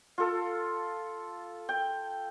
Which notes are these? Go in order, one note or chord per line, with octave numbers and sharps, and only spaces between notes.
F4 A4
G5